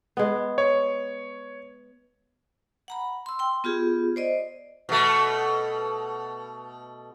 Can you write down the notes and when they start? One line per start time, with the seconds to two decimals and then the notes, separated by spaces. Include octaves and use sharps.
0.17 G#3 B3
0.58 C#5
2.88 F#5 A#5 B5
3.26 C6 E6
3.39 G5 C6
3.64 B3 F4 G4 G#4
4.16 C5 D5 D#5
4.89 B2 A3